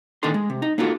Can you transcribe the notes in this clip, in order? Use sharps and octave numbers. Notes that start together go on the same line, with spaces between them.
A#2 D#3 D4 D#4 A4 C6
G#3
C3
D#4
A#3 D#4 F4 F#4 A4